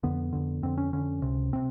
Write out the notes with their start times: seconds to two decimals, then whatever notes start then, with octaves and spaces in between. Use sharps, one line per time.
0.03 F2 D3 B3
0.33 F2 D3
0.63 F2 D3 C4
0.78 C#4
0.93 F2 D3 C#4
1.22 C#2 C3
1.53 C3 C4